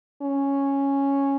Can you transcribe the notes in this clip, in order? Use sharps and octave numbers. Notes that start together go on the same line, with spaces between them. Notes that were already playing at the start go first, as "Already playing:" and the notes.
C#4